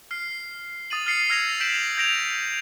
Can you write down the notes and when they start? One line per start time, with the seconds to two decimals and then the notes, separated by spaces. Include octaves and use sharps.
0.11 F6 C7
0.90 D#6 A6 D#7 F#7
1.06 F6 A6 C7 C#7 D#7
1.30 E6 F6 G#6 A#6 D#7 F7
1.60 G6 B6 D7 E7 F#7
1.97 G6 G#6 A#6 D7 E7 F7